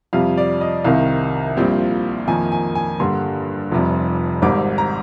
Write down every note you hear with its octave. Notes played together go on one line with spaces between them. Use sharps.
F2 C3 G3 F5
D5
D#5
C2 C3 D#3 F5
A#1 A#2 G3 C4
F2 D#3 A#3 G#5
G#5
G#5
G2 D3 G3 A#3 C6
F1 F2 C3 G3
G#1 G#2 G3 D6
A#5